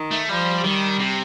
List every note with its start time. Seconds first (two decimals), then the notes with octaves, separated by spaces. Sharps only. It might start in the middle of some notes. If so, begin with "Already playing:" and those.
Already playing: D#3
0.11 A3
0.29 F3 G3
0.64 D#3 G3
0.99 C3